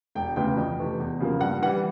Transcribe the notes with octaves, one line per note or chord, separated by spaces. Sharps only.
E1 G5
D2 C#3 E3 G5
F2
C3 E3 A3
E2
C#3 F3 A#3
G2 F#5
E3 G3 F#5